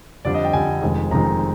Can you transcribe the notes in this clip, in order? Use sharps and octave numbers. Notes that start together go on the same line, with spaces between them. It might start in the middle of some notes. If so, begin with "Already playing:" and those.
F2 D3 G3 D4 D5
D#5
G5
F2 D3 G3 D4 G#5
F1 F2 D#3 G#3
F1 F2 D#3 G#3 A#5